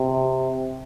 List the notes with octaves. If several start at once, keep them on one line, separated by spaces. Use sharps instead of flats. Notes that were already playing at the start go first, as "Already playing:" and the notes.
Already playing: C3